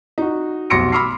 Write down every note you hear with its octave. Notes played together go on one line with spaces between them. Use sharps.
D#4 F#4
F1 B1 C6 A#6 C#7 D7
B5 C6 D6 E6 F6 C7